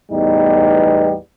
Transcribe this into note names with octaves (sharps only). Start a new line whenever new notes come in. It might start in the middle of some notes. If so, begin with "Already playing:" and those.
E2 A2 G3 B3 D#4